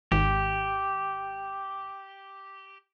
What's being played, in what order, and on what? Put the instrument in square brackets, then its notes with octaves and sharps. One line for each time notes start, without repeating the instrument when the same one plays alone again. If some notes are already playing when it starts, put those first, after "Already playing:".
[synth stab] G#1 [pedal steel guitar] G4